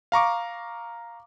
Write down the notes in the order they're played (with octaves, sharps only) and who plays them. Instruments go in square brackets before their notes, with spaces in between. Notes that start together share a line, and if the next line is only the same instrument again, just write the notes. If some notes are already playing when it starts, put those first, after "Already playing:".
[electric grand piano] F5 A#5 C#6 D6